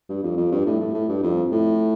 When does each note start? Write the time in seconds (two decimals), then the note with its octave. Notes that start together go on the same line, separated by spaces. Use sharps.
0.09 G2
0.23 F2
0.37 F2
0.51 G2
0.66 A2
0.80 A2
0.94 A2
1.09 G2
1.23 F2
1.51 A2